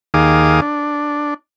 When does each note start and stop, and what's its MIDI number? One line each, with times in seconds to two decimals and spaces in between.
0.14 0.60 39
0.14 0.60 51
0.14 0.60 68
0.14 0.60 77
0.14 0.60 86
0.14 0.60 87
0.62 1.34 62